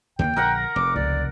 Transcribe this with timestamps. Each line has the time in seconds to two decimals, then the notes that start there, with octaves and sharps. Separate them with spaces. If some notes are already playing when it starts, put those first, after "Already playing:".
0.19 D#2 D3 G#3 A#3 G5
0.36 A#1 A#4 F#5 A#5
0.76 F1 D6
0.96 C#2 D5